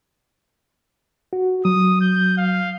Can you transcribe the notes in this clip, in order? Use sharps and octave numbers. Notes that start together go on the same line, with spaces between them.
F#4
F#3 D#6
G6
F5